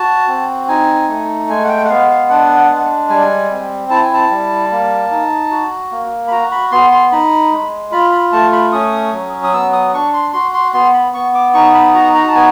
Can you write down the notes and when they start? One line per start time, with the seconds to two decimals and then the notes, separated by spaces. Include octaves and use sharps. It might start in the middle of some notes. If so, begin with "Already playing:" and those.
Already playing: F#4 A5
0.28 C4
0.68 D#4 G#5
1.08 A3
1.49 G#3 G#5
1.64 F#5
1.69 G5
1.85 F#5
1.89 B3 F5
2.10 F5
2.29 D4 F#5
2.69 G#3
3.09 G3 G#5
3.51 C4
3.90 E4 A5
4.02 G#5
4.13 A5
4.31 G3
4.71 A#3
5.11 D#4
5.51 F#4
5.91 A#3
6.28 B5
6.31 F#4 A#5
6.52 B5
6.72 B3 C6
6.92 C6
7.12 D#4 B5
7.52 G#3
7.92 F4 B5
8.12 B5
8.32 A3 A5
8.53 B5
8.72 C#4 D#6
9.13 F#3
9.43 D#6
9.53 B3 E6
9.73 D#6
9.93 D4 C#6
10.13 C6
10.33 F#4 C6
10.54 C6
10.74 B3 C6
10.94 B5
11.14 B3 C#6
11.34 D6
11.54 D#4 C#6
11.74 B5
11.94 F#4 A#5
12.15 A#5
12.28 A5
12.35 B3 G#5